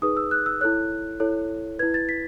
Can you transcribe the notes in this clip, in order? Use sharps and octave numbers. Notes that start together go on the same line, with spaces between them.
D#4 G#4 B4 D#6
E6
F#6
E6
E4 A4 C#5 F#6
E4 A4 C#5
E4 B4 G#6
A6
B6